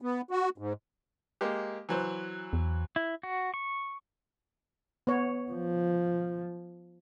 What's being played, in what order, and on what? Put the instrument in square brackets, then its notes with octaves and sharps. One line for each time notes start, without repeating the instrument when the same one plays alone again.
[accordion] B3
F#4
G#2
[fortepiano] G#3 A#3 G4
E3 F#3 C5
[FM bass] E2
[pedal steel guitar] E4
F#4
C#6
[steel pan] B3 C#5
[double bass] F3